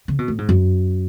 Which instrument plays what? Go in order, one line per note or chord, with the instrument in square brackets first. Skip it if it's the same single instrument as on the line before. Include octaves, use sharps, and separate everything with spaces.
[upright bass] C#3
B2
A2
G#2
F#2